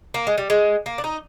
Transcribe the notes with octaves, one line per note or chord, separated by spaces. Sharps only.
A#3
G#3
G3
G#3
A#3
D4
D#4